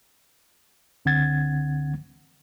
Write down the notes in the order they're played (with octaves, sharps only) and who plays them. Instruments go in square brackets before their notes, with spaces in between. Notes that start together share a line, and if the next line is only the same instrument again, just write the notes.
[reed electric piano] C#2 D3 C4 F#5 G#6 A6